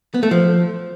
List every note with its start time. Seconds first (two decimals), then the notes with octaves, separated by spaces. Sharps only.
0.14 B3
0.23 A3
0.31 F3